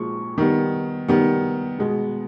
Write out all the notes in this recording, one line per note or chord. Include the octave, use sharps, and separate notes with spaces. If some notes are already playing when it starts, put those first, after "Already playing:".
Already playing: A#2 F3 G#3 C#6
D#3 G3 B3
D#3 G3 B3
B2 G#3 B3